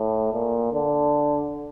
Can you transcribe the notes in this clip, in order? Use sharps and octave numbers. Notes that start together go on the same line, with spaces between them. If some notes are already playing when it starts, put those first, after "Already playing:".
Already playing: A2
A#2
D3